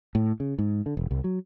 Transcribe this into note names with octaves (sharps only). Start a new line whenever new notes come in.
A2
C#3
G#2
D3
E1
C2
F#3